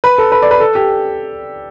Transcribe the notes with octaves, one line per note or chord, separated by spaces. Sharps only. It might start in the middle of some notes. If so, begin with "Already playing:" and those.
B4
A4
B4
D5
B4
A4
G4